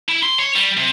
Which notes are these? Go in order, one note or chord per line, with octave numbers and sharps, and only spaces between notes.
E4
C6
C#5
G3
C3